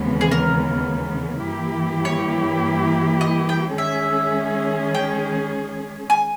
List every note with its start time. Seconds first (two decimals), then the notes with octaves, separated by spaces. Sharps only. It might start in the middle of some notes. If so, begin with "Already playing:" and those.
Already playing: D#2 C#3 E3 G#3 B3
0.21 G#4
0.31 A#4
1.47 G2 E3 A#3 E4 G4
2.05 C#5
3.21 D#5
3.49 G5
3.78 D#3 G#3 C#4 G#4 E5
4.95 G5
6.10 G#5